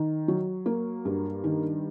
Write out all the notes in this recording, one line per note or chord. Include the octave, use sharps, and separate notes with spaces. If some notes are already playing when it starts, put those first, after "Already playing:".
Already playing: D#3
F#3
A#3
G2
D#3